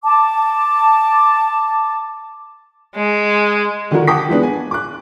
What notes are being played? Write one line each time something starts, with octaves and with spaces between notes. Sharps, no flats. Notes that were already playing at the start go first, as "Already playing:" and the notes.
A5 D6
G#3
D3 D#3 F3 G3 F#4 A#4
F#5 G5 A5 D6 D#6 B6
E3 G#3 B3 D4
G#5
D6 F#6